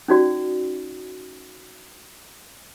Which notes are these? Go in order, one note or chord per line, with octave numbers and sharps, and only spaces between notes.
C#4 D#4 F#4 D5